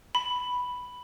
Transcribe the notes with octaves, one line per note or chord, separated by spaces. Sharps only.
B5